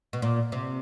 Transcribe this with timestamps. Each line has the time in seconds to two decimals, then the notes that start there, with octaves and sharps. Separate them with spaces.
0.13 B2
0.22 A#2
0.52 C3